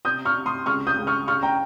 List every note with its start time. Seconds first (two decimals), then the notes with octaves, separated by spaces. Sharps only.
0.05 C3 D#6 G6
0.25 C#6 F6
0.36 C3
0.46 C6 D#6
0.66 C#2 C#6 F6
0.87 D#6 G6
0.97 C#2
1.07 C#6 F6
1.27 C#3 C#6 F6
1.43 G5 A#5